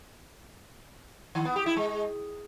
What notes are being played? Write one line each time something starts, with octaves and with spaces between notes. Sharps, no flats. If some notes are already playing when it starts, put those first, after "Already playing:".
D#3
B3
G4
E4
G#3